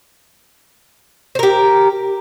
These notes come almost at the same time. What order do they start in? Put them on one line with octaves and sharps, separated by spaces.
C5 A#4 G4